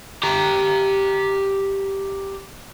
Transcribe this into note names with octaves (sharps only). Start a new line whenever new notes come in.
G4 A#5